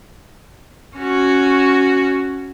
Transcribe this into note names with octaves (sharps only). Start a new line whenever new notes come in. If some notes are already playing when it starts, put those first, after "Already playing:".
C#4 F#4